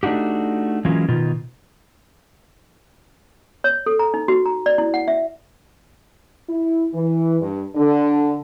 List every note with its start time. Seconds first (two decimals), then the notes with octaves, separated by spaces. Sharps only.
0.03 A3 D4 D#4 F#4 G4
0.85 E3 F#3 G#3 A#3 C#4 F4
1.09 B2 D#3 F4
3.64 C#5
3.86 A4
3.99 A#5
4.14 D#4
4.28 F#4
4.46 A#5
4.66 D5
4.78 E4
4.94 F#5
5.08 E5
6.49 E4
6.94 E3
7.41 G2
7.75 D3